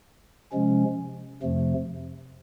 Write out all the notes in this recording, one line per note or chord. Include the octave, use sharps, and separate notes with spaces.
C3 F3 G#3 C#4
F2 C3 F3 A3